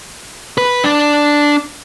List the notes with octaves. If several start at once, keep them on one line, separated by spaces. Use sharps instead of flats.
B4
D4